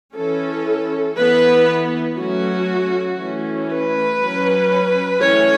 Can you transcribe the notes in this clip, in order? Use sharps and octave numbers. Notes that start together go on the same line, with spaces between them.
E3 C#4 A4
E3 B3 B4
F#3 A3 C#4 F#4
E3 A3 C#4
B4
F#3 C#4
E3 A3 C#4 C#5